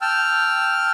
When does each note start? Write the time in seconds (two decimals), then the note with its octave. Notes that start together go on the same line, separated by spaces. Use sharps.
0.01 G5 A5 E6 F6